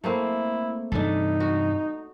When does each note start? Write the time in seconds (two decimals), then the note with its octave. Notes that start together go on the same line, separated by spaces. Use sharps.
0.04 A3 A#3 C4 E4
0.92 G2 C3 E3 D4 D#4 A4
1.40 F#4